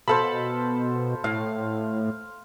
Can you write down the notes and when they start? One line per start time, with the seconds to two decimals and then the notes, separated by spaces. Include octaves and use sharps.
0.08 B2 A4 C5 F5 A5 B5
1.24 A2 F5